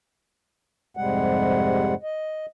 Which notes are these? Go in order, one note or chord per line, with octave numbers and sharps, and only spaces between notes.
F2 G#2 C3 G3 G#3 F#5
D#5